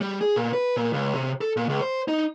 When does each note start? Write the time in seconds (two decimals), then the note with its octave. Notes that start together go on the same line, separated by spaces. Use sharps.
0.01 G3
0.21 G#4
0.36 A#2
0.53 B4
0.77 A#2
0.93 C#2
1.15 C3
1.41 A4
1.57 A#2
1.69 C#2
1.81 C5
2.08 D#4